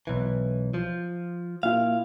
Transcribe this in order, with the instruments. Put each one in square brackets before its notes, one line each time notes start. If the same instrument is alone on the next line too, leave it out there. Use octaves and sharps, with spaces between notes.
[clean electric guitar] B1 E3
F3
[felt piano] A#2 E4 [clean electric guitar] F5